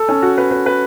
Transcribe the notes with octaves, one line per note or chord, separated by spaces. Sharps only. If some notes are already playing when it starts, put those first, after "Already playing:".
Already playing: A4
C#4
F#4
B4
B4
B4